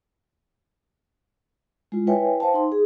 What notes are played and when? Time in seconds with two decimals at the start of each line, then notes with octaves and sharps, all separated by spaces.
1.92 G#3 E4 F4
2.07 E4 B4 C#5 E5 G5 G#5
2.40 C5 F5 G5 A5
2.54 D#4 C6
2.72 G#4